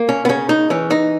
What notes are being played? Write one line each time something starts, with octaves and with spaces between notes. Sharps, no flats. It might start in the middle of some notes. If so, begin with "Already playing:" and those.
Already playing: A#3
C#4
B3
C#3 C#4
D#4
E3 C#4
D#4